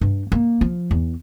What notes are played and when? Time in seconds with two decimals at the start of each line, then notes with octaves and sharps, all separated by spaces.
0.01 G2
0.32 A#3
0.61 F3
0.91 E2